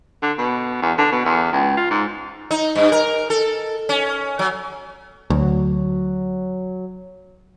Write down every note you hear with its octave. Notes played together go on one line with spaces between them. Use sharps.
D3
B2
E2
D3
B2
E2
C#2
F4
G#2
D#4
G2
A#4
A4
C#4
F#3
D2 F#3